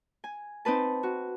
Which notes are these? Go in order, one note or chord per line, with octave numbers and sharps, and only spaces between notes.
G#5
C4 D#4 B4 A5
F#4